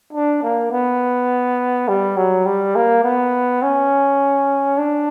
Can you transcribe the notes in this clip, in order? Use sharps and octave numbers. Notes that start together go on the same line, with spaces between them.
D4
A#3
B3
G3
F#3
G3
A#3
B3
C#4
D4